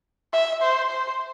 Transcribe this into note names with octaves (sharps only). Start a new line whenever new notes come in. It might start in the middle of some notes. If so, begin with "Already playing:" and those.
E5
C5
C5